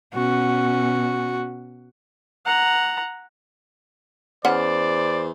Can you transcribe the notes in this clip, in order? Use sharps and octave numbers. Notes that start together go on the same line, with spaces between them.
B2 C#4 F#4
F#5 A#5
E2 C#4 C5 D5 F#5